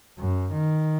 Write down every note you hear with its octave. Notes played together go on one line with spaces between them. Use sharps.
F#2
D#3